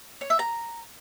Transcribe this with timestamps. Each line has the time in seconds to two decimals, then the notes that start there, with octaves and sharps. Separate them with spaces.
0.21 C#5
0.30 E5
0.39 A#5